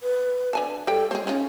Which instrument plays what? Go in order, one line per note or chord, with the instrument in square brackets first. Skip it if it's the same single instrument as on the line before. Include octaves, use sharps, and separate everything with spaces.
[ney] B4
[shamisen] D3 G#5 A5
[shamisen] G3 G#3 G5 [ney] A4
[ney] G#3 [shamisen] G#4 C5
[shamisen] G#3 D#4 F4 [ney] C#4